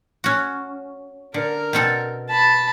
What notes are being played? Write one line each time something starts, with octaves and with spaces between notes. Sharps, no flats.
C#4 F#4
D3 A#4
B2 C4 A4
A5 B5